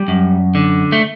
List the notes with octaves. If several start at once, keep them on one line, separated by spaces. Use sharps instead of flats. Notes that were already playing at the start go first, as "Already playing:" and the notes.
Already playing: G3
F#2
D3
A3